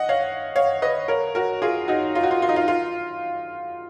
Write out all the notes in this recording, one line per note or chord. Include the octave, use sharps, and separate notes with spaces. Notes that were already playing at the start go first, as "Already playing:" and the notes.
Already playing: D#5 F#5
C#5 F5
C#5 F5
B4 D#5
A#4 C#5
F#4 A#4
F4 G#4
D#4 F#4
F4
F#4
F4
F4
D#4
F4
F4